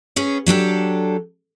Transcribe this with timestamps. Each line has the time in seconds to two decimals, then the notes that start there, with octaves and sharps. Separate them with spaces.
0.16 B3 C#4 G#4
0.46 F#3 D4 G4 A4